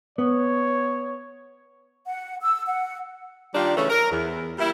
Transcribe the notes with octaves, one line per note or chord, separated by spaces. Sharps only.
B3 C#5
F#5
E6
F#5
D#3 G3 D4 F4 G4
C#3 E3 A3 C#4
A#4
E2
G3 A#3 E4